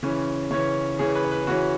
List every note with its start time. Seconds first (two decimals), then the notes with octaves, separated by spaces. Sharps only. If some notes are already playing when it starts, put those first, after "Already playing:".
0.03 C#3 E3 C#4 B4
0.50 C#3 E3 C#4 C#5
0.99 C#3 E3 C#4 G#4
1.15 B4
1.25 C#5
1.31 B4
1.47 C#3 E3 C#4 F#4